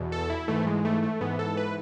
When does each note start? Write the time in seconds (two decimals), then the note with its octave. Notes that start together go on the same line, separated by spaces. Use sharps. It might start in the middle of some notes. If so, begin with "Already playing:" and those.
Already playing: E2 B2
0.12 A4
0.30 E4
0.48 G#2 E3 A3
0.67 G#3
0.85 A3
1.03 A3
1.21 G#2 E3 B3
1.39 A4
1.57 B4